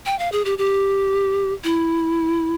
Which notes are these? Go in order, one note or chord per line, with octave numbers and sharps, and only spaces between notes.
G5
F5
G#4
G4
G4
E4